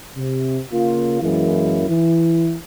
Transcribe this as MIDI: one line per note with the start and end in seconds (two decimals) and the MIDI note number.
0.16 0.60 48
0.71 1.18 49
0.71 1.18 58
0.71 1.18 65
1.22 1.84 42
1.22 1.84 52
1.22 1.84 56
1.22 1.84 58
1.22 1.84 64
1.89 2.57 52
1.89 2.57 64